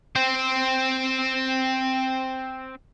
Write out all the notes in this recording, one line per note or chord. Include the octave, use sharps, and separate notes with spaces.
C4 C5